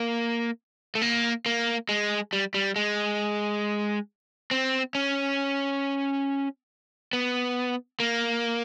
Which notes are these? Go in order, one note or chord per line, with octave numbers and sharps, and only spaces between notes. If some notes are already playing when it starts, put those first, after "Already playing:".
Already playing: A#3
A3
A#3
A#3
G#3
G3
G3
G#3
C4
C#4
B3
A#3